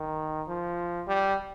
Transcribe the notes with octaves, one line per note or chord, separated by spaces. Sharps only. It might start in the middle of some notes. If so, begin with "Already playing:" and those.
Already playing: D#3
F3
G3